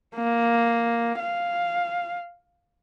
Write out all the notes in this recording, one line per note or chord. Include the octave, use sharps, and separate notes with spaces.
A#3
F5